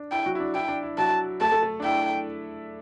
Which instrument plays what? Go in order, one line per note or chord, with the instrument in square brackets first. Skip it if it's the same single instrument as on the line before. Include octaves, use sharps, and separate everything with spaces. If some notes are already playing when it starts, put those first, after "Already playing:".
Already playing: [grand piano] D4
[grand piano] E4 [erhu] G5
[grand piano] F#3 F#4
E4
D4
[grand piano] E4 [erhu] G5
[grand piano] D4
E4
[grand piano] F#3 F#4 [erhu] A5
[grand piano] A3 A4 [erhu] A5
[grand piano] A3 A4
A3 A4
D4
[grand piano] E4 [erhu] G5